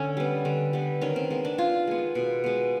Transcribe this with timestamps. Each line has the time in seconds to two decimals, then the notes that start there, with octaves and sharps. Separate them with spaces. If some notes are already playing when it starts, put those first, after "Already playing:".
Already playing: D3 C#4
0.17 G3 B3
0.45 D3
0.73 G3 B3
1.01 D#3 C#4
1.16 C4
1.30 G#3 B3 C4
1.45 D4
1.58 D#3 F4
1.87 G#3 B3
2.15 B2
2.44 G#3 B3